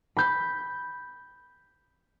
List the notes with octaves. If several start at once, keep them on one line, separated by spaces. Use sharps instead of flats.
B5 G6